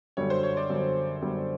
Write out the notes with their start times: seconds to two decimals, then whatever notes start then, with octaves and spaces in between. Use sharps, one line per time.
0.17 F#2 D3 G3 C#5
0.30 C5
0.43 C#5
0.57 D5
0.70 F#2 D3 G3
1.22 F#2 D3 G3